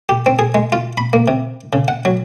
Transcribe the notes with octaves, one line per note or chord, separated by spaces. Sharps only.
G4
C4
G#4
G#3
F4
B5
A#3
C3
C#3
F#5
F#3